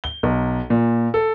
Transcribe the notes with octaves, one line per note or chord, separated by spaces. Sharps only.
G7
B1
A#2
A4